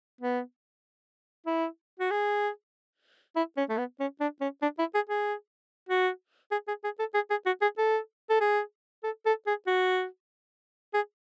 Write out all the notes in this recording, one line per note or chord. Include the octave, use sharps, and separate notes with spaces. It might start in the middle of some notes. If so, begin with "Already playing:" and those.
B3
E4
F#4
G#4
E4
C#4
A3
B3
C#4
D4
C#4
D4
E4
G#4
G#4
F#4
G#4
G#4
G#4
A4
G#4
G#4
F#4
G#4
A4
A4
G#4
A4
A4
G#4
F#4
G#4